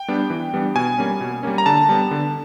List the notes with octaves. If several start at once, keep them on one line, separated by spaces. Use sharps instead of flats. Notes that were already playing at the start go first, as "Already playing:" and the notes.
Already playing: G5
G3 B3 D4
E3
G3 B3 D4
B2 G#5
G3 A#3 C#4
B2
G3 A#3 C#4
A#5
D3 A5
G3 B3
D3